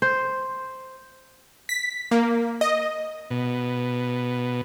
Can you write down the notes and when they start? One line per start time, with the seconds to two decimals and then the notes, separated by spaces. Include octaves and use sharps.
0.02 C5
1.69 B6
2.11 A#3
2.61 D#5
3.30 B2